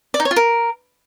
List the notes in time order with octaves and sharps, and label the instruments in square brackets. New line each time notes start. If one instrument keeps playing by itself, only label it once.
[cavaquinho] D5
D#4
C#5
F4
A#4